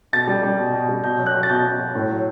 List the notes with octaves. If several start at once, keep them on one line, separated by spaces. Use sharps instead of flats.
B2 A6
G3
G3
B2
B2
G3
B2 G6
F#3
F#6
F#3
A6
B2 G6
B2
F#3
A2
F#3